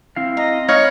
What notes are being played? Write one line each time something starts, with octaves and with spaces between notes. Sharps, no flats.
C4 E4 F5
D#5 A#5
D#4 C#5 F5 B5 D#6 F6